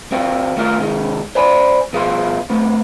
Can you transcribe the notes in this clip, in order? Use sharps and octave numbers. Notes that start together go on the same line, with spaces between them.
C4 F#4 F5 G5
D#2 A3 F4 A#4 F5
C3 D#3 G#3
C5 D5 G#5 B5
B2 F3 G#4 E5 F5 C6
A3 B3 C4